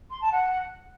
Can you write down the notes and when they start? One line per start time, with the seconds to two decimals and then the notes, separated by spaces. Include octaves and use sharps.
0.11 C6
0.21 A5
0.32 F#5